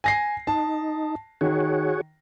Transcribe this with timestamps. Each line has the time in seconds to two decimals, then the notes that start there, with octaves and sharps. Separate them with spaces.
0.04 G#5 A#6 C7
0.47 D#4 A5
1.41 D#3 F#4 G#4 C#5